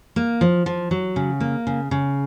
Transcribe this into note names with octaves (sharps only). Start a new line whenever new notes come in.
A#3
F3
F3
F#3
C#3
A#3
C#3
C#3